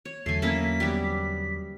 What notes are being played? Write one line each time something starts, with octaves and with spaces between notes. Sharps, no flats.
C#5
E2 D3 F#3 A3 G#5 C7
A#3 C#4 E4 B6
G3 B3 G4
B6